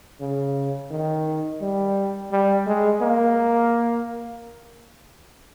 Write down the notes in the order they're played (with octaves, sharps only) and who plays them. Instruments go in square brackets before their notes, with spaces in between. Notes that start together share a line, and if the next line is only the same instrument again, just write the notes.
[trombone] C#3
D#3
G3
G3
G#3
A#3